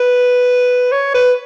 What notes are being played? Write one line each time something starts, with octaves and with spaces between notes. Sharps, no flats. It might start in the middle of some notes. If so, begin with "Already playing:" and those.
Already playing: B4
C#5
B4